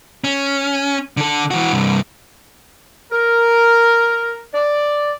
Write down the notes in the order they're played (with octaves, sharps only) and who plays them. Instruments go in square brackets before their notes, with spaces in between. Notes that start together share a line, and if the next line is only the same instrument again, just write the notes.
[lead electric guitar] C#4
D3 A4
E3 F#4
C2 G2
[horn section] A#4
D5